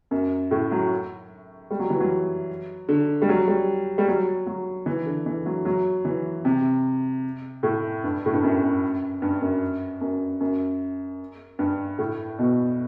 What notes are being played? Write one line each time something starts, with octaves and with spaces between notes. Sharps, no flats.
F#2
A2
F#3
G3
F#3
E3
F#3
D3
G3
F#3
G3
G3
F#3
F#3
E3
D3
E3
F#3
F#3
E3
C3
A2
G2
A2
G2
F#2
F#2
G2
F#2
F#2
F#2
G2
A2
B2